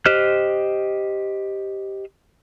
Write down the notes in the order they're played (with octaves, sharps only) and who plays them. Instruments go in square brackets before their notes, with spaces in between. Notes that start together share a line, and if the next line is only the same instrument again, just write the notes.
[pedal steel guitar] G4 C5 D#5 F6 F#6